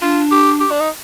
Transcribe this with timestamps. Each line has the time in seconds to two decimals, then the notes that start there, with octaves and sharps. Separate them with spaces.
0.02 D4 F4
0.31 G4
0.60 G4
0.71 D4
0.80 D#4